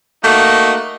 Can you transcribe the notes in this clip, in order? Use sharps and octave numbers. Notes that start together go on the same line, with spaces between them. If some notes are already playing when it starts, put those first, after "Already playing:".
A3 A#3 D#4 F#4